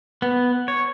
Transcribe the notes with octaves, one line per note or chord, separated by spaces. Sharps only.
B3
C#5